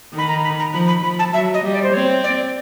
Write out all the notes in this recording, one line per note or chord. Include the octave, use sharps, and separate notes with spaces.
D#3 B5
A#5
B5
A#5
F3 B5
B5
F3 B5
A5
F#3 E5
D#5
G3
D5
C5
C4 C#5
D5